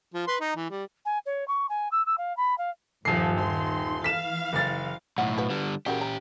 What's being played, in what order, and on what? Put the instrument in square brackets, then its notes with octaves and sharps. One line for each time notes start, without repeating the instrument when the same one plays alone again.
[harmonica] F3
B4 C6
D#4
E3
G3
[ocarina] G#5
C#5
C#6
G#5
E6
E6
F5
B5
F5
[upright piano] D#1 C7 [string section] G2 F3
[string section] D#3 C6
[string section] E3 F5 [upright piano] B6 E7
[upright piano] F#1 A6
[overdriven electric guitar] B1 A2 [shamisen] F#5
[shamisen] F3 F#4 B4
[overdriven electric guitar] D3 G3
[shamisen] C#3 F#4 A#4 [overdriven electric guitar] C#4 G4
[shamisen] A#5